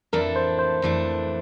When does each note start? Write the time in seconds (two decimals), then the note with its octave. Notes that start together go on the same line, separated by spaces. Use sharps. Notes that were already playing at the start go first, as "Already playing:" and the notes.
0.13 F2 E3 A3 D4 A4 A#4
0.36 C5
0.59 C5
0.82 F2 E3 A3 D4 A4